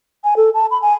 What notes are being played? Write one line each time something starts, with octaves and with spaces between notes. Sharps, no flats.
G#5
A4
A5
B5
G#5